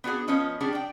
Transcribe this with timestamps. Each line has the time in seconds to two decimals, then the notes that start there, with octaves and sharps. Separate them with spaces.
0.04 B3 D4 F#4 G#4 F#5
0.28 F3 B3 C#4 D#5
0.61 G3 C#4 D4 G#4 D5 F#5
0.73 D4 G5